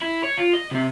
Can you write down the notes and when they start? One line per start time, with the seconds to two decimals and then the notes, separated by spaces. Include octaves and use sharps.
0.01 E4
0.24 C#5
0.37 F4
0.54 D#5
0.71 C3 C4